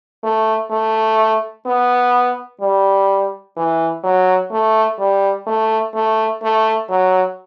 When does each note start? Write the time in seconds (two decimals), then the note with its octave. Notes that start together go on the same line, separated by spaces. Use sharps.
0.23 A3
0.71 A3
1.66 B3
2.61 G3
3.57 E3
4.04 F#3
4.51 A3
4.99 G3
5.47 A3
5.94 A3
6.42 A3
6.89 F#3